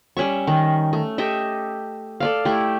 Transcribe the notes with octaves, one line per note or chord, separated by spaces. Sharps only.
G3 C#4 E5 C#6
D#3
A3
G4 A4 D#5 E5
A4 D5 F5
A3 E4 G4